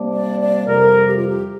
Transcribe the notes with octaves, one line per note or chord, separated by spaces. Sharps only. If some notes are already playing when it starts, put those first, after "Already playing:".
Already playing: C3 G3 A#3 D4
D5
D5
F2 C3 G3 A#4
G4
F4
G4